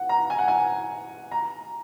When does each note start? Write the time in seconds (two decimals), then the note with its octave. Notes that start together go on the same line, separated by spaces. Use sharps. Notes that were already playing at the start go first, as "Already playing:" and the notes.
Already playing: F#5
0.09 A#5
0.30 G#5
0.39 F#5
0.48 G#5
1.32 A#5